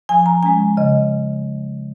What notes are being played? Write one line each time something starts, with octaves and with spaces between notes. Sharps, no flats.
F3 G#5
A#5
G#3 C#4 G#5
C#3 D#5